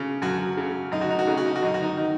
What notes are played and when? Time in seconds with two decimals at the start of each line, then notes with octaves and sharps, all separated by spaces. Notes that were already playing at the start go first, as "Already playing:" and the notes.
Already playing: C#3
0.22 F#2 F#4
0.57 C#3
0.92 F#2 D#4
1.01 F#4
1.10 D#4
1.19 F#4
1.27 C#3 D#4
1.37 F#4
1.46 D#4
1.56 F#4
1.63 F#2 D#4
1.74 F#4
1.82 D#4
1.97 D#3